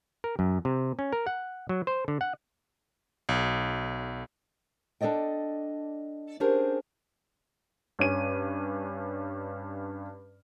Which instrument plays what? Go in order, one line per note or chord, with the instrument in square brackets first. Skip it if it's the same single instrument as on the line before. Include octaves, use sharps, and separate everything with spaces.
[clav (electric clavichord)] A#4
F#2
C3
C#4
A#4
F#5
F#3
C5
D3
F#5
[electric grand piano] B1
[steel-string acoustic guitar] D4 A4 D5 D#5 G5
C#4 D4 G4 G#4 A#4 C5
[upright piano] G2 C#4 D#7